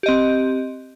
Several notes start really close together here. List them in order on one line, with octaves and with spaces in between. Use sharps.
G4 D#5 C4